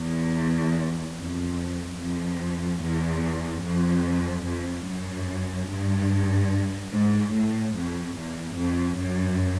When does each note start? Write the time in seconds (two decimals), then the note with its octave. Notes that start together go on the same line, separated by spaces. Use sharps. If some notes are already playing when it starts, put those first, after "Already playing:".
Already playing: E2
1.17 F2
1.99 F2
2.82 E2
3.64 F2
4.47 F2
4.87 F#2
5.70 G2
6.93 G#2
7.34 A2
7.76 F2
8.17 E2
8.58 F2
8.99 F#2